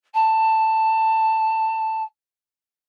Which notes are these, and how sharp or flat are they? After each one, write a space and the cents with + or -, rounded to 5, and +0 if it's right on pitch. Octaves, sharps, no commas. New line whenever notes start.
A5 +10